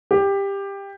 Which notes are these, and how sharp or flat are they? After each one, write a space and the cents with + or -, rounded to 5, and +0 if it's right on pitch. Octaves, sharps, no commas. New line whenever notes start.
G4 +15